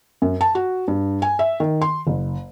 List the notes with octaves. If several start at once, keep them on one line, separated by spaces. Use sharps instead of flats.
F#2
A5
F#4
G2
G#5
E5
D#3
C6
F#1